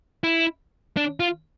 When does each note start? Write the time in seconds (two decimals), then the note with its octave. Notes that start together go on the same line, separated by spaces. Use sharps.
0.24 E4
0.97 D4
1.20 F4